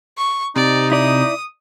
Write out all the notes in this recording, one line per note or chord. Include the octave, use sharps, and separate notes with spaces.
C#6
C3 D#4 D5
E4 D5 D#6